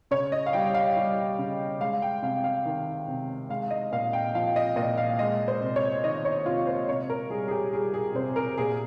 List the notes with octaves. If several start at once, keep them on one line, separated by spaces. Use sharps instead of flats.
C#3 C#5
D#5
F5
G3 G5
F5
G3
C#3
G#3 F5
G5
C3 F5
F5
D#3
C3
G#3 F5
D#5
A#2 F5
G5
F3 F5
D#5
A#2 D#5
F5
G#3 D#5
C5
C3
C#5
D#3 D#5
C#5
C3 F4
C5
C3 C#5
A#4
G3 G#4
G#4
G4
G3 G#4
G#4
C3 C5
A#4
A#2 G#4